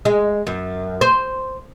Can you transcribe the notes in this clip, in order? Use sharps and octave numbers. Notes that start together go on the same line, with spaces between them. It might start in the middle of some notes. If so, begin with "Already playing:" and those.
G#3
F#2
C5